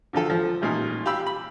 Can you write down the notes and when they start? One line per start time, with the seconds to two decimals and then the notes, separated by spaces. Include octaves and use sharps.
0.13 D3 F3 F4 A4
0.30 F3
0.62 A1 A#2 D#4 G#5
1.06 G4 F5 G5 G#5 B5 E6
1.26 B5